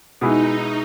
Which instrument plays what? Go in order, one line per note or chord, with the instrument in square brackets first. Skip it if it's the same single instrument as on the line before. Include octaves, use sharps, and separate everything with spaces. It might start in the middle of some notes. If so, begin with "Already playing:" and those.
[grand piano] B2 G#3 B3 E4 G#4 [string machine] D#4